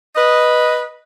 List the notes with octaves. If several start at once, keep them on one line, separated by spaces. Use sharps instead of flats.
B4 D#5